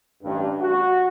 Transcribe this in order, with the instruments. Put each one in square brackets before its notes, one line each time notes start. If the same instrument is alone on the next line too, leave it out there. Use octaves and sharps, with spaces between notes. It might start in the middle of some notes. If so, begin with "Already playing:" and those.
[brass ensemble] A1 G2
F#4